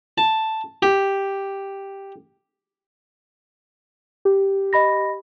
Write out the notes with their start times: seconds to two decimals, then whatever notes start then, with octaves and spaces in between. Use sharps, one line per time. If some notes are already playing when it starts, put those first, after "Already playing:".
0.18 A5
0.83 G4
4.25 G4
4.73 D#5 B5 A#6